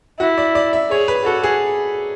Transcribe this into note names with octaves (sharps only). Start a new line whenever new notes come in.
E4 F#4
D5
D5
E5
G#4 C#5
B4
F#4 A4
G#4